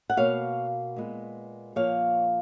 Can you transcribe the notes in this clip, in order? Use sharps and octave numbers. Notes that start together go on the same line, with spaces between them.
F#5
B2 A#3 C#5 F5
A#2 G#3 B3
A#2 F3 A#3 C#5 F5